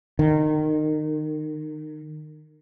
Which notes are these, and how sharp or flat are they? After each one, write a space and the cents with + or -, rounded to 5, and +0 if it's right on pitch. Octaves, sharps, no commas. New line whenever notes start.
D#3 -25